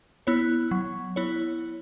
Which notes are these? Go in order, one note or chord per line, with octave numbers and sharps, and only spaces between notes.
B3 E4 C#5
F#3
B3 E4 C#5